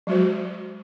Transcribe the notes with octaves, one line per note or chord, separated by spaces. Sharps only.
F#3 G#3 F#4 C5